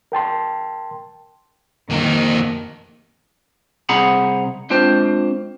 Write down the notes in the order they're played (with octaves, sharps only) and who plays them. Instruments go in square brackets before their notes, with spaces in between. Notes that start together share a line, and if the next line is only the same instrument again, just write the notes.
[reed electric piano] A#4 G5 A5 C6
[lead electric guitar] F2 A#3 [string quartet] D#3
[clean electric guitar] C2 C4 G#4 F#5 A#5 B5
G#3 C4 D4 F4 C5